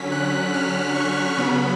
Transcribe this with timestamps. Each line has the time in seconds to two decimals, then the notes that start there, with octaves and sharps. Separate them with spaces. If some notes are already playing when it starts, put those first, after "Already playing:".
Already playing: D3 F#3 C#4 B6
0.12 F#6
0.54 F6
0.95 C#6
1.37 C#3 F#3 B3 B5